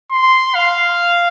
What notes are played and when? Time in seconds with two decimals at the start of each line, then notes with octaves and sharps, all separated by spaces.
0.11 C6
0.55 F5